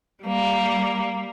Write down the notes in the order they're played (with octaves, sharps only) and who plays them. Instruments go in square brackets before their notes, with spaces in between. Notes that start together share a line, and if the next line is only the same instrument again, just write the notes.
[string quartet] G3 A#3